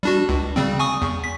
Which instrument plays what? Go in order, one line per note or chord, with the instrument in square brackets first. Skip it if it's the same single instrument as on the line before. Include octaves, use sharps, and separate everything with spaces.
[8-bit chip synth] G3 D4 F#4
C#2
C#3 G3 C4
G#5 C#6 D#6
E2
B6